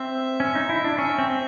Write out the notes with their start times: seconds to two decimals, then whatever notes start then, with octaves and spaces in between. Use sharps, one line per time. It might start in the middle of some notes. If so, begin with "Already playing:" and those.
Already playing: C4 E5
0.40 C#4
0.55 D#4
0.69 E4
0.84 D4
0.99 C#4 E5
1.18 C4